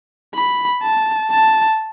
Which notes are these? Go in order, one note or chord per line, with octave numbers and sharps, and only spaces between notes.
B5
A5
A5